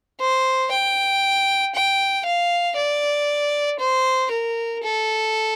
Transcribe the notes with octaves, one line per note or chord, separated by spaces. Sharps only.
C5
G5
G5
F5
D5
C5
A#4
A4